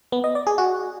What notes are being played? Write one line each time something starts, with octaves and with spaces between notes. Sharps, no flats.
B3
D#5
D5
G#4
F#4